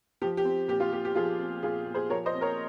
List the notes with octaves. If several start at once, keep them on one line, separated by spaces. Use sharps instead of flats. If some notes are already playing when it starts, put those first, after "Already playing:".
F3 G4
G4
C4
A#2 G4
F4
A#2 G4
G4
F3 F4 G#4
C4
A#2 F4 G#4
A#2
G#4 C5
F3 A#4 C#5
C5 D#5
C4
A#4 C#5